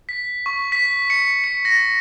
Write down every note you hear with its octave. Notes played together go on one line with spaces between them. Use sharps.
B6
C#6
B6
C#7
C#7
A#6